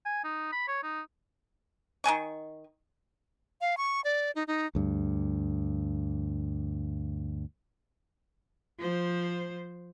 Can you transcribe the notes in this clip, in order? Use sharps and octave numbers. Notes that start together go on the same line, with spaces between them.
G#5
D#4
B5
C#5
D#4
D#3 D#5 G#5 C#6
F5
C#6
D5
D#4
D#4
D2 G2
F3 C5